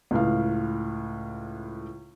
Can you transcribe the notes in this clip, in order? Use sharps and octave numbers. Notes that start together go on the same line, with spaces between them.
C#2 A2 F5